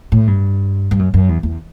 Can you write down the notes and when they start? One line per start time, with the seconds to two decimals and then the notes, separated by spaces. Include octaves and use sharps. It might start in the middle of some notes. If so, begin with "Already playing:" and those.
0.12 A2
0.27 G2
0.91 G2
0.99 F#2
1.14 F#2
1.29 E2
1.43 E2